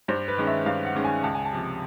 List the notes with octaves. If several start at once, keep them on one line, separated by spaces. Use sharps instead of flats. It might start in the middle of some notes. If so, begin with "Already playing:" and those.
G2 C5
B4
D#3 G#3 C#4
E5
G2 F5
F#5
D#3 G#3 C#4
G#5
C#2 A5
G#5
A5
C3 F3